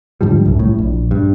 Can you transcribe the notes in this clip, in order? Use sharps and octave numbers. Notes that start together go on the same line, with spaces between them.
G#2 D3 F3 G3
C2 F#2
A2
A#1
G2